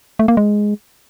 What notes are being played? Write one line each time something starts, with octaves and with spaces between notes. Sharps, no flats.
A3
A#3
G#3